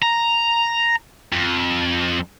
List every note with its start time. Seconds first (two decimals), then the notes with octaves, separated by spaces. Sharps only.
0.02 A#5
1.33 F2